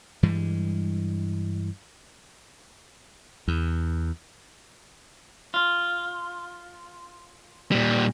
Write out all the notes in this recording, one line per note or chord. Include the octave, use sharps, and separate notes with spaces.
G2 E3 G3 G#3
E2
F4
A#2 G3